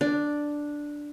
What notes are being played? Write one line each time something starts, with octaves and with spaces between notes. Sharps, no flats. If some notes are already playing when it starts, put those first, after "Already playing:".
D4